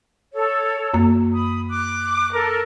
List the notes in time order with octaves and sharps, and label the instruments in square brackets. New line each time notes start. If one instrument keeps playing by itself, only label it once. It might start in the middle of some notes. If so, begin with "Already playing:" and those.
[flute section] A4 C#5
[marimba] F#2 A#3
[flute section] B5 D#6
D6 F#6
A4 A#4